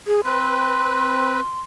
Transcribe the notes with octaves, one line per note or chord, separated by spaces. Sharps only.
G#4
C4 B4 C6